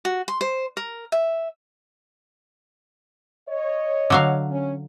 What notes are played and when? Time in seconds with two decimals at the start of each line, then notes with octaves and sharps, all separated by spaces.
0.05 F#4
0.28 C6
0.41 C5
0.77 A#4
1.12 E5
3.48 C#5 D#5
4.10 D3 F#3 F5
4.50 C#4